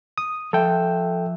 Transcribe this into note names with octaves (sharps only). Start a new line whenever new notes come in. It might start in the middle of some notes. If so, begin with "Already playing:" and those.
D#6
F3 A4 E5 G5